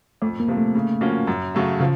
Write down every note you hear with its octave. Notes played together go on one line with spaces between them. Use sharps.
F2 A3
A#3
C3 F3
A3
C#3
F3 A#3 C#4 F#4
F#2
C#3 F#3 A3
C#3 F3